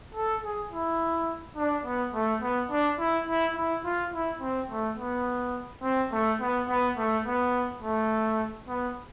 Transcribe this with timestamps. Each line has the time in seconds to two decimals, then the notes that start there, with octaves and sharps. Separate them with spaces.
0.14 A4
0.43 G#4
0.71 E4
1.57 D4
1.85 B3
2.14 A3
2.42 B3
2.71 D4
2.99 E4
3.27 E4
3.56 E4
3.84 F4
4.13 E4
4.41 C4
4.70 A3
4.98 B3
5.83 C4
6.12 A3
6.40 B3
6.68 B3
6.97 A3
7.26 B3
7.82 A3
8.68 B3